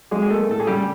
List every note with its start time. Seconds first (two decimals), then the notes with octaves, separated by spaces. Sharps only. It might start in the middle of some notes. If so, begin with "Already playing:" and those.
0.11 F#3 G#3 G#4
0.22 G#4
0.30 A3 A#3 A4
0.49 A2 A4
0.60 G#4
0.67 C#3 G3 G4